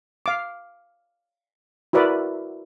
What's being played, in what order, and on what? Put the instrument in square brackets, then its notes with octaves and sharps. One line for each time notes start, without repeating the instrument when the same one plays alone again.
[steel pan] F5 D6
E4 F#4 A#4 B4 D5 E5